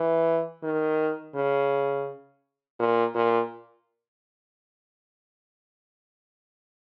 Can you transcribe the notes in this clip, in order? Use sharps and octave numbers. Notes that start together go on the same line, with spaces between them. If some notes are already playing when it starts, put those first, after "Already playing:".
Already playing: E3
D#3
C#3
A#2
A#2